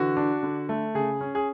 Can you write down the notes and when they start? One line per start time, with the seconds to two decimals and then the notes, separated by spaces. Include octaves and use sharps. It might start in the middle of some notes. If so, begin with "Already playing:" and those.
Already playing: D3 E3 F#4
0.17 D4
0.43 D3
0.69 A3
0.95 C#3 G#4
1.21 C#4
1.35 G#4